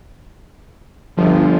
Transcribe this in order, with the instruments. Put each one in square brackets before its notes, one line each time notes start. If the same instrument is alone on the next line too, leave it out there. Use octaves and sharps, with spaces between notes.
[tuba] G1 [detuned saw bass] F3